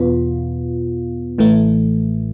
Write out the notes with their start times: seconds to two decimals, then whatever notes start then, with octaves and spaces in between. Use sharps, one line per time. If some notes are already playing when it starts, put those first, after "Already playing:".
Already playing: E2 B2 B3 F4
1.38 A1 A2 E3 A3